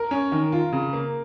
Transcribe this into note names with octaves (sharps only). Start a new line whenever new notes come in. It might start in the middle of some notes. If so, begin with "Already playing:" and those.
Already playing: A#4
C#4
D#3
F4
C#3
A#3